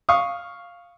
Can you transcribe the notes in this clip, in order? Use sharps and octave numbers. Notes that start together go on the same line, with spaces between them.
F5 C#6 D#6